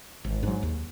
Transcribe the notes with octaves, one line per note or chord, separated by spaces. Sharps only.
G#1
G#2 F#3
D#2